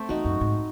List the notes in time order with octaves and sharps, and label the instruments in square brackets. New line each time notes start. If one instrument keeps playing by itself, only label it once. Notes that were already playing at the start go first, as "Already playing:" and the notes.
Already playing: [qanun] A3 C4
[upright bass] E2 [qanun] D#4 F#4
[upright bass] F#2
G#2